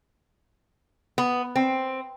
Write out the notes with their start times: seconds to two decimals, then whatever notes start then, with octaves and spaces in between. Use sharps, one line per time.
1.18 B3
1.56 C4